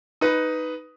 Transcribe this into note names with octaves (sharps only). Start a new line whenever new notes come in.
D#4 B4